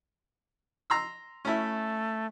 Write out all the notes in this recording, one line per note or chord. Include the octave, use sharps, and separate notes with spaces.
A#5 C6 E6
A3 C#4 E4